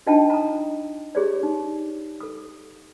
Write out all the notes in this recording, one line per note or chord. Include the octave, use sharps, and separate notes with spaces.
D4 D#4 F4 D#5 G5 A5
A#5 D#6
G4 G#4 C#5 D5
D#4
A4 D#6